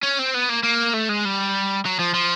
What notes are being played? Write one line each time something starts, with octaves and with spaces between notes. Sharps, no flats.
C#4
C4
B3
A#3
A#3
A3
G#3
G3
F#3
F3
F3